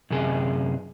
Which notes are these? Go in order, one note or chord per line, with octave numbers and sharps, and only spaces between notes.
F#2 C3 G#4